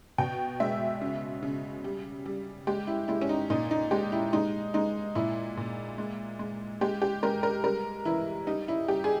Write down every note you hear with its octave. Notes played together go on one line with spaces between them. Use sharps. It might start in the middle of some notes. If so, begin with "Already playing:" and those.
B2 G5
G#3 E5
C#3
C#3
G3
G3
G#3 G4
E4
G#3 E4
C#4
D#4
A#2 D#4
D#4
G#3 G4
E4
G#3 D#4
G#3 D#4
A#2 E4
A#2
G#3
G#3
G#3 G4
G4
G#3 A#4
A#4
G3 A#4
E3 E4
G3 D#4
E4
G3 G4
G#4